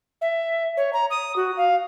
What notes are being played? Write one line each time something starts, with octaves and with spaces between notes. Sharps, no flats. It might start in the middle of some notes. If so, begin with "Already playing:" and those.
E5
C#5
A#5
D#6
F#4
F5